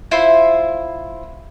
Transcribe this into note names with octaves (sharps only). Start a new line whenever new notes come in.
E4 F4 C5 E5